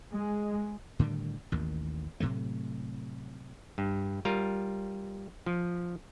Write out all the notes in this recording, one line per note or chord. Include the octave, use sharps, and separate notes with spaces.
G#3
A2 D3 D#3 G3
A1 D#2 D#3
A2 C3 F#3 A3
G2
G3 F4 A#4
F3